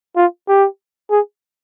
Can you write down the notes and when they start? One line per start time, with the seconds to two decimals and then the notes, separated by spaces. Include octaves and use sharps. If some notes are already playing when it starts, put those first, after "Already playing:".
0.17 F4
0.48 G4
1.11 G#4